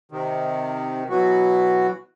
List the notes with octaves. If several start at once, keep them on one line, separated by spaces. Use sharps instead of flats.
C3 D#3
B2 E3 F#3 F#4